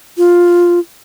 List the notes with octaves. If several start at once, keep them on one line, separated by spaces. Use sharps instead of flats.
F4